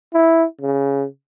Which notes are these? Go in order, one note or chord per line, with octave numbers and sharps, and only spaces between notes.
E4
C#3